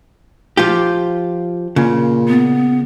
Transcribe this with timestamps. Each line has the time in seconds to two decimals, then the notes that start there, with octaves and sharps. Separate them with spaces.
0.57 F3 F4 G4
1.76 A#2 C#3
2.28 B3